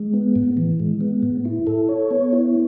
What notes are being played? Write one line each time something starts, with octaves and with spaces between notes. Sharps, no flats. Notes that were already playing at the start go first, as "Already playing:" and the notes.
Already playing: G#3
B3
A2
E3
G#3
B3
A2
E4
A4
C#5
B3
E4